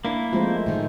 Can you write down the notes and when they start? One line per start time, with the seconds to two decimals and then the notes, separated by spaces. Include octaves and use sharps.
0.05 A#3 D4 E4
0.33 F3 G#3 A3 C4 C5
0.66 A2 D#3